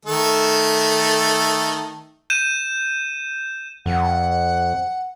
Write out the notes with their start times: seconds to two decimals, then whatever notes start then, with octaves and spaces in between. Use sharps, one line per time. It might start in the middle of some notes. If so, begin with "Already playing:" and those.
0.05 D#3 A3 A4
2.30 G6 D#7 E7
3.86 F2 F#5